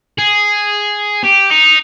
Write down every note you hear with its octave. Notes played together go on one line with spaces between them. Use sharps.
G#4
G4
D#4